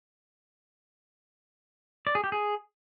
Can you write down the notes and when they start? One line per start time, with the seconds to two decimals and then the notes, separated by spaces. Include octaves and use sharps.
2.07 D5
2.15 G#4
2.24 G4
2.32 G#4